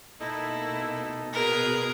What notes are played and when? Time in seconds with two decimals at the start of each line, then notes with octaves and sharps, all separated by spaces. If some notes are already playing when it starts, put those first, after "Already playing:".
0.20 B2 A#3 D#4 E4 A4 D#5
1.33 B2 G#4 A#4 B4